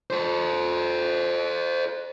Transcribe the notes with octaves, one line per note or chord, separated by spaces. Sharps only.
A4 C5